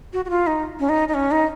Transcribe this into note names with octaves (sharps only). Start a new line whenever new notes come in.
F#4
F#4
F4
D#4
C#4
D#4
D#4
C#4
D#4